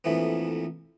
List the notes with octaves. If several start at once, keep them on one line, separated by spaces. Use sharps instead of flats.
A#1 F2 E3 A3 B3